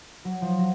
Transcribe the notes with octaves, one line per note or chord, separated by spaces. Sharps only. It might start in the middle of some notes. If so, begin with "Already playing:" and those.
F#3
F3
F#3